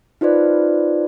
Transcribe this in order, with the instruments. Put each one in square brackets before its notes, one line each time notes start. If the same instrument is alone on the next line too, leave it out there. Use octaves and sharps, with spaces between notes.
[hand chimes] D#4 F4 B4 C5 D5